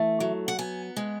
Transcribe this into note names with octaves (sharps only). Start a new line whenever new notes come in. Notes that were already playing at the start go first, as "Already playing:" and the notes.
Already playing: E3 A3
F#3
F#5
B3 G#5
G#3